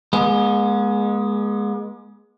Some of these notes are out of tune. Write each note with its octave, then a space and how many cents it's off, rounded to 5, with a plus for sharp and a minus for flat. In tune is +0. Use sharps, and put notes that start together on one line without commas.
G#3 +0 B3 -45